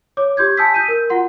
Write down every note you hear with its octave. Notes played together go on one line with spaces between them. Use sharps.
C#5 D6
G4 C6 G6 G#6
G#5 A5 D#6 E6 G6 B6
G6 B6 D#7
A#4
F4 F#4 F#5 C6